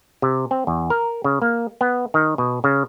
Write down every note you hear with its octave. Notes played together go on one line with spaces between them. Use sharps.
C3
C4
E2
A#4
C#3
A#3
B3
D#3
B2
C#3